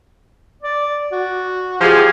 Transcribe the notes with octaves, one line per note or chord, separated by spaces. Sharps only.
D5
F#4
F3 F4 G4 G#4